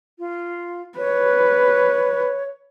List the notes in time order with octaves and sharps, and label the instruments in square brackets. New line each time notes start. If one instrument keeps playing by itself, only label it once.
[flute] F4
[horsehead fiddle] B4 [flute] C#5